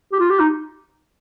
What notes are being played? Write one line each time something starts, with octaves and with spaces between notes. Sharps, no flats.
G4
F4
G4
D#4